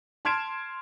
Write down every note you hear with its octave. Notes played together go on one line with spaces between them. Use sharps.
A5 C6 F6 G#6 D7 E7